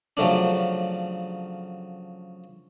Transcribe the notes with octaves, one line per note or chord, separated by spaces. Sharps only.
C#3 F3 F#3 A3 C#4 D4